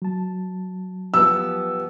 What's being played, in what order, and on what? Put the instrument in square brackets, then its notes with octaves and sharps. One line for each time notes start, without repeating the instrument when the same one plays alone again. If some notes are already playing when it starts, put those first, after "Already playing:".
[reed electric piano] F#3 A5
[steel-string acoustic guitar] F3 B3 G4 [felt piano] E6